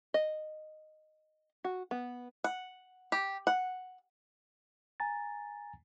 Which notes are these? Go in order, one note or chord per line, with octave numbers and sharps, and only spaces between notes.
D#5
F#4
B3
F#5
G4
F#5
G#5 A#5 A6